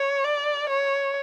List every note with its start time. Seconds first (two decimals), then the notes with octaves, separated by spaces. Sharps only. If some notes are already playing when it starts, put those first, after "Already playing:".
Already playing: C#5
0.24 D5
0.69 C#5